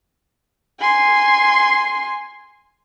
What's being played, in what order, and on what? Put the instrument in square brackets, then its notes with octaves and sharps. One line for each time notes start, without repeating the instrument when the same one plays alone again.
[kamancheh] G#5 C6